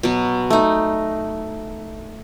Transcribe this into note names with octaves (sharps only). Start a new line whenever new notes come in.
B2 F#3
A3 D#4